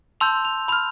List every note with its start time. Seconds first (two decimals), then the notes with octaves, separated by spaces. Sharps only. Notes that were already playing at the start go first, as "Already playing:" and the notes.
0.21 A5 C6 E6 G6 F7
0.45 F7
0.68 B5 F7
0.72 F6